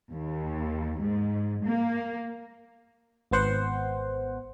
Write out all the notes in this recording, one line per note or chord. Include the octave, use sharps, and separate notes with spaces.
D#2
G#2
A#3
G#1 B3 C5 F#5